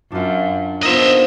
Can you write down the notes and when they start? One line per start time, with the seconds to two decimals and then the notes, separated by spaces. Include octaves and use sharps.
0.12 F#2 D4 F4
0.83 A#3 B3 D4 D#4 F4 C5 D#5 E5